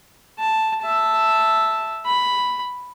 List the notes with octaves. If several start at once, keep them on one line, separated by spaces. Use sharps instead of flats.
A5
E5 A5
B5